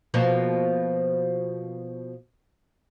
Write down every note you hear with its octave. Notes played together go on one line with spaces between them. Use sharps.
B2 F3 A#3